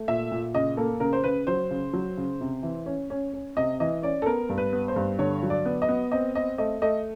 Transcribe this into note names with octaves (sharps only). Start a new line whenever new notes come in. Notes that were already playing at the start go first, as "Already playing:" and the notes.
Already playing: A3
A#2 E5
A#2
C#3 D#5
A#3 A4
C#3 A#4
C5
C#3 B4
F#3 C5
C#3
F#3
C#3
C3
E3
C#4
C#4
C#4
C3 D#5
E3 D#5
C#4 D5
A4
B3 A#4
G2
B4
B3
C5
G2
D3 C#5
F#3
D5
B3
D#5
B3
C4 D#5
C4 D#5
A3 D#5
A3 D#5